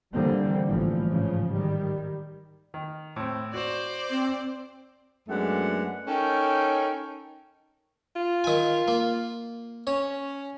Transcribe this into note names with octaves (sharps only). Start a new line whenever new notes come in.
D3 E3 G3 A#3 C4
A1 G2 E3 F3
G#2 C#3 F3
D#3 G3
D#3
A2 C4
F#4 C5 D5
C4
F#2 G#3 A3 B3 D4 F#5
C#4 D#4 A4 A#4 C#5 G5
F4
D#3 G#5
A#3
C#4 C#5